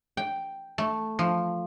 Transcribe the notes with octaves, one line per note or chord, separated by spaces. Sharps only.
G5
A3
F3